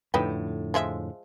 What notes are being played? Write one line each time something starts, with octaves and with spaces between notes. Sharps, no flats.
F2 A2 D3 D#4 B4 G5
F3 G#3 E5